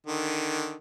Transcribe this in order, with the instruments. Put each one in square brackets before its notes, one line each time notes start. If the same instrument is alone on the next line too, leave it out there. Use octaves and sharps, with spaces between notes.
[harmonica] D3 D#3